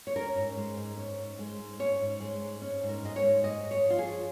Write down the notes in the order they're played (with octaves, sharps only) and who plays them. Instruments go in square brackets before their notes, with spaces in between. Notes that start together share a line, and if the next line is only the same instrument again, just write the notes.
[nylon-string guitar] C#5
C#4 A#4
G#2
G#3
G#2
C#4
G#2
G#3
G#2
C#4 C#5
G#2
G#3
G#2
C#4
G#2
A#4
G#3 D#5
C#5
G#2
G#3 D#5
G#2
C#5
F3
F4
G#4
C#4